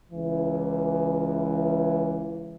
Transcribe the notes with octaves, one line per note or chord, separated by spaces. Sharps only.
C#2 E3